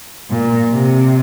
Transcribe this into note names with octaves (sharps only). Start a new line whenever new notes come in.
A#2
C3